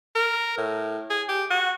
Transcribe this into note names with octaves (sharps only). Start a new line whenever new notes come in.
A#4
A2
G#4
G4
F#4